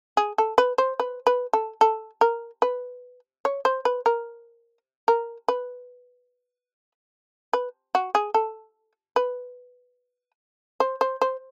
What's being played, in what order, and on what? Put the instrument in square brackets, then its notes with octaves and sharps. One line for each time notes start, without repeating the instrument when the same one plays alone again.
[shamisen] G#4
A4
B4
C5
B4
B4
A4
A4
A#4
B4
C#5
C5
B4
A#4
A#4
B4
B4
F#4
G#4
A4
B4
C5
C5
C5